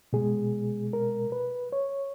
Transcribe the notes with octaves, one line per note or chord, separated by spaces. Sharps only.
B2 G#3 G#4
A#4
B4
C#5